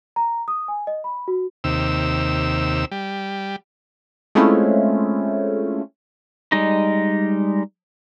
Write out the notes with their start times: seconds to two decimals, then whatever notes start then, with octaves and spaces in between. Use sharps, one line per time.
0.16 A#5
0.48 D#6
0.68 G#5
0.87 D#5
1.04 B5
1.28 F#4
1.64 D#2 C3 E6
2.91 G3
4.35 G#3 A3 C4 C#4 E4 F4
6.52 G3 G#3 D#4 D#5